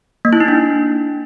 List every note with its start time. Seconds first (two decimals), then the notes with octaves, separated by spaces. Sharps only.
0.25 A#3
0.33 E4
0.40 D#4
0.48 D4